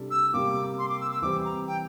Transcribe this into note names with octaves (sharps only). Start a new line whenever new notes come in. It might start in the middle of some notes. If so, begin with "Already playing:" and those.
Already playing: C3 G3 D4 A4
E6
C3 G3 A#3 D6
C6
D6
E6
E6
E3 G3 C4 D6
A#5
G5